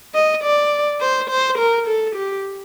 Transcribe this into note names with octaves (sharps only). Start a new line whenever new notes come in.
D#5
D5
C5
C5
A#4
A4
G4